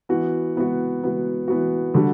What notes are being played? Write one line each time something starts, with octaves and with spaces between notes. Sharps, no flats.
E3 B3 F#4
E3 B3 F#4
E3 B3 F#4
E3 B3 F#4
D3 G3 D4 F#4